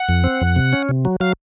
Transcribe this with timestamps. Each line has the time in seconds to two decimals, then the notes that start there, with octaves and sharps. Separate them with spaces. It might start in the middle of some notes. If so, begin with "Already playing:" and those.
Already playing: F#5
0.09 F2
0.24 C4
0.41 F2
0.56 C3
0.73 C#4
0.89 C3
1.05 F#3
1.20 F#3 F5